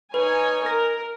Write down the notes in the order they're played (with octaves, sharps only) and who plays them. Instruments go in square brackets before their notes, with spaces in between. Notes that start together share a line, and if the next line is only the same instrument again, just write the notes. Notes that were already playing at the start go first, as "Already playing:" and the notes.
[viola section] D#4 C#5 G#5 [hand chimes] B4
[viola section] A#4 [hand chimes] A#6